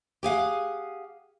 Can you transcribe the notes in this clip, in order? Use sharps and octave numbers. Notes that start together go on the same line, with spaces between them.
G4 G#4 F5 F#5